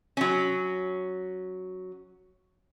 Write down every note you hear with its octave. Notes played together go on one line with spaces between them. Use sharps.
F#3 C#4